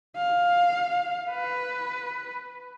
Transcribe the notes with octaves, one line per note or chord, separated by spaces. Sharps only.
F5
B4